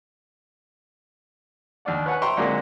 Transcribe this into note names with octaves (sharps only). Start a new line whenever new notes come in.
D#2 D4 D5 F#5
B4 C#5 F#5 G#5
E5 G5 A#5 C6 C#6
A#2 D3 F#3 G#3 A#3 C4